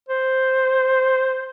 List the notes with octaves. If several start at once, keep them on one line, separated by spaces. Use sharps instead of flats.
C5